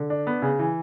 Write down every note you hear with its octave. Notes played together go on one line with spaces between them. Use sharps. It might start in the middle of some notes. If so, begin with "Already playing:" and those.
Already playing: D3
D4
B3
C#3
E3